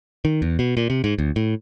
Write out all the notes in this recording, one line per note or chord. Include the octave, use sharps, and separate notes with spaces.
D#3
E2
B2
A#2
C3
G#2
D2
A2